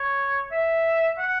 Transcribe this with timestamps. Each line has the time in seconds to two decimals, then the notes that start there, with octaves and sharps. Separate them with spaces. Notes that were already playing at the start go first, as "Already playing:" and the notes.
Already playing: C#5
0.52 E5
1.19 F#5